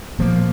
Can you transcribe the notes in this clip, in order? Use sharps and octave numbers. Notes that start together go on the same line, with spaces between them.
A#2 F3 A#3